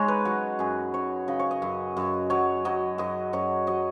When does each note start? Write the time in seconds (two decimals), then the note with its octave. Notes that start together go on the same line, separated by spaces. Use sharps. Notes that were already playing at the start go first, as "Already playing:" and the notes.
Already playing: G#2 G#3 C#4 D#4 C#5
0.08 B4
0.25 F#3 F#4
0.59 F#2 G#4
0.94 F#2 C#5
1.28 C#3 D#5
1.39 C#5
1.51 D#5
1.62 F#2
1.97 F#2
2.30 F#3 C#5
2.65 F#3 D#5
2.98 F#2 D#5
3.33 F#2 C#5
3.67 F#3 D#5